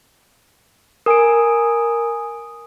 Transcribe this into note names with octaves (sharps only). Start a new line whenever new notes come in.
A#4 G#5 D#6 D7